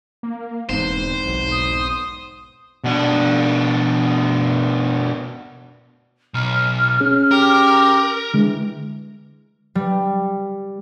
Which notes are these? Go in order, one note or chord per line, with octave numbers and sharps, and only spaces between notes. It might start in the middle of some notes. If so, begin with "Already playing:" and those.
A#3
E1 E2 G#2 C4 C5
B1
D#6
B2 D4
B1 F6
C#4 G#4
G4 A#4
D3 E3 G#3
G3